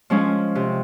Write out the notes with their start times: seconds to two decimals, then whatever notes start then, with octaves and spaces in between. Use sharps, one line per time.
0.10 F3 G#3 C#4
0.55 C3